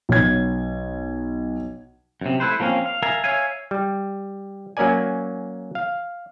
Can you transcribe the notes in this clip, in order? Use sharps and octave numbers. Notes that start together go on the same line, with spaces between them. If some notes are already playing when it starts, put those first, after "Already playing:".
B1 G#6
F#2 C3
A3 E4 B4 C5
F3 A#3 C4 C#4 F5
F5
A#4 E5 F5 G#5 A5
C#5 E5 F5 G#5
G3
F#3 A#3 C#4 A#4 D5 G#5
F5